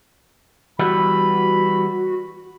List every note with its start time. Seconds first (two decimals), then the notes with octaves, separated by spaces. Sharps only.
0.79 E3 G3 B3 F#4 B5